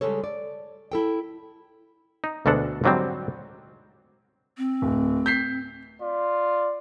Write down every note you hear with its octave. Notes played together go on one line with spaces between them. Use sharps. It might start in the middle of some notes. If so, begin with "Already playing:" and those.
C#3 G3 G#3 A4 C#5
D5
E4 A4 G5
D#4
D2 B2 G#3 D4 A4 F#5
G#2 D3 F#3 G3 C4
C4
D1
G6 B6 C7
F4 D5